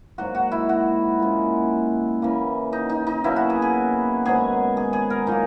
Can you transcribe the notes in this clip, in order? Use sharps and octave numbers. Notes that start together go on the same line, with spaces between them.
G#2 F#3 A#3 F#4
F#4
E4
F#4
A#2 G#3 C#4
C#3 E3 A#3
D#4
D#4
D#4
B2 F#3 A#3 C#4 E4
F#4
G#4
G#4
G#2 D#3 F#3 B3 G#4
G#4
G#4
A#4
A#2 F#3 A#3 D#4